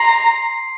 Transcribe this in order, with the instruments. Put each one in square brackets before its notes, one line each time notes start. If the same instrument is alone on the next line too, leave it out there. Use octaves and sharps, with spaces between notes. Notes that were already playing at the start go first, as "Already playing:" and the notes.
Already playing: [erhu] A#5 [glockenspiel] C6 C7